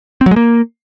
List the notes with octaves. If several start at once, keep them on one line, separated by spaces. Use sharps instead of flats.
C4
F#3
G#3
A#3